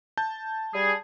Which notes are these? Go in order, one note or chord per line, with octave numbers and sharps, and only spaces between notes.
A5 G6
G3 G#4